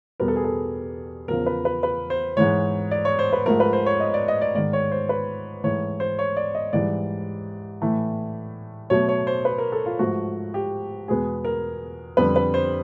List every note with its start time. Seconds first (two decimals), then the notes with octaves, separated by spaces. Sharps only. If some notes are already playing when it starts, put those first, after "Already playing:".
0.20 E2 B2 G3 B3 A#4
0.28 A4
0.36 G#4
0.44 A4
1.28 E2 C#3 F3 A#4
1.46 B4
1.65 B4
1.83 B4
2.10 C5
2.37 G#2 E3 G#3 C#5
2.91 D5
3.05 C#5
3.19 C5
3.33 B4
3.46 G#2 F3 A3 A#4
3.60 B4
3.73 C5
3.86 C#5
4.00 D#5
4.14 D5
4.28 D#5
4.41 D5
4.55 G#2 D#3 G#3 D5
4.73 C#5
4.92 C5
5.09 B4
5.64 G#2 E3 A3 C#5
6.00 C5
6.19 C#5
6.37 D5
6.55 D#5
6.73 G#2 E3 G3 D5
7.82 A2 E3 A3
8.90 B2 F#3 A3 C#5
9.09 C#5
9.27 C5
9.45 B4
9.58 A#4
9.72 A4
9.86 F4
9.99 G#2 F3 A3 F#4
10.54 G4
11.08 E2 B2 G#3 B3 G#4
11.44 A#4
12.17 F2 D3 G3 B3 B4
12.36 B4
12.54 C5